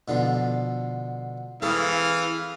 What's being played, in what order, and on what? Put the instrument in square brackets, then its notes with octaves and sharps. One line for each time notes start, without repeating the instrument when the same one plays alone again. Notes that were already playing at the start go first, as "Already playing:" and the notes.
[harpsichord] B2 D3 F3
[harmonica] E3 F5 [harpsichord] C4 G#4 A4